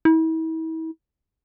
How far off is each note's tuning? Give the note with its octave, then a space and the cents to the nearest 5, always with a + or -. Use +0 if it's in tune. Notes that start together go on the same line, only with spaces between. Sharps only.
E4 -40